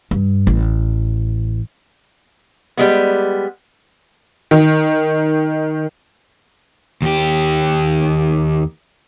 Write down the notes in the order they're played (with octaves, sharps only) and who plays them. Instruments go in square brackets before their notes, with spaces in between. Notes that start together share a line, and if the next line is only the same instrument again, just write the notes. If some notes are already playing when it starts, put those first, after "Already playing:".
[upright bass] G2
A1
[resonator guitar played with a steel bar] G3 G#3 B3
[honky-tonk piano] D#3
[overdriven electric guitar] D#2 G4